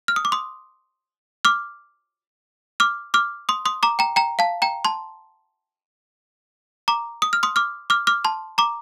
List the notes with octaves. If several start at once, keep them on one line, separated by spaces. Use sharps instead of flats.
F6
D#6
D6
C6 D#6
D6 F6
D6 F6
D6 F6
C6 D#6
C6 D#6
A#5 D6
G5 A#5
G5 A#5
F5 A5
G5 A#5
A5 C6
A#5 D6
D#6
F6
C6 D#6
D6 F6
D6 F6
D6 F6
A5 C6
A#5 D6